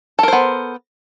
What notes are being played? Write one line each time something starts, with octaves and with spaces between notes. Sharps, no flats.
B3 A4 A#4 C5